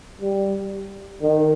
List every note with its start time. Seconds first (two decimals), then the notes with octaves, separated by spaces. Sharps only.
0.21 G3
1.22 D#3